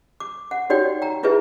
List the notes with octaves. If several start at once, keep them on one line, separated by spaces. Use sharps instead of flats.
D6
F#5
D#4 F#4 G4 C#5 D5 G5
G5 A#5
E4 F4 G#4 B4 E5